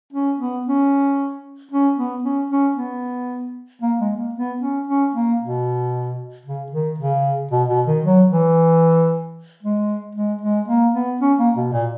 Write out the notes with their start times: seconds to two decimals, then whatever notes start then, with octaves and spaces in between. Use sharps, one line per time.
0.13 C#4
0.39 B3
0.66 C#4
1.71 C#4
1.98 B3
2.24 C#4
2.50 C#4
2.76 B3
3.82 A#3
4.00 G#3
4.17 A#3
4.35 B3
4.61 C#4
4.87 C#4
5.14 A#3
5.40 B2
6.46 C#3
6.72 D#3
6.98 C#3
7.51 B2
7.69 B2
7.86 D#3
8.04 F#3
8.30 E3
9.62 G#3
10.15 G#3
10.41 G#3
10.68 A#3
10.94 B3
11.21 C#4
11.38 A#3
11.56 B2
11.73 A#2